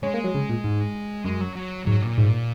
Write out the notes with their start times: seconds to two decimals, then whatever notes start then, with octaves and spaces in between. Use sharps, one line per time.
0.03 G#3 C#4
0.14 A#3
0.24 F#3
0.34 C#3
0.49 A#2
0.64 G#2
1.25 F#2 G#3
1.41 F#3
1.56 F#3
1.86 G#2 F#3
2.02 A#2
2.18 G#2